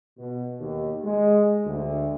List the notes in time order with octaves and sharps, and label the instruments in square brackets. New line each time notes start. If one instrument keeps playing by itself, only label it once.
[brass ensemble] B2
D#2
G#3
D2